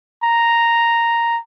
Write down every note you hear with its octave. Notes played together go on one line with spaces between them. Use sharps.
A#5